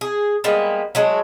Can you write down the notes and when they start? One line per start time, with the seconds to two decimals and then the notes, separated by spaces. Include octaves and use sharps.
0.01 G#4
0.44 G3 G#3 A#3 B3
0.95 F#3 G#3 A3